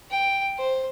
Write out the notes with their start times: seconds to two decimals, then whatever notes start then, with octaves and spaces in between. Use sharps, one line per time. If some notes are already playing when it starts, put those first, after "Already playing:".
0.11 G5
0.58 C5